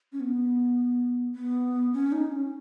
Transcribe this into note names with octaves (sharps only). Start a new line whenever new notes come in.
C#4
B3
B3
C#4
D#4
C#4